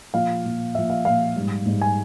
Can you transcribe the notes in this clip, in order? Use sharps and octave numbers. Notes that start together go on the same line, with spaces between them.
A#2 F3 F5
A#2 F3
A#2 F3 E5
F5
A#2 F3 F5
G#2 G3
G#2 G3
G#5